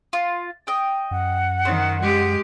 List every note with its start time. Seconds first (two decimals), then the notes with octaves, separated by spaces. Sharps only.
0.13 F4
0.67 D#5 G5
1.11 F#2 F#5
1.65 D#3 C5
2.02 G#3 G4